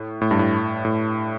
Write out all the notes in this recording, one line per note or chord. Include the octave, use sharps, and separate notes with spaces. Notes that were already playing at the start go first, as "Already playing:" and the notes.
Already playing: A2
A2
G2
A2
A2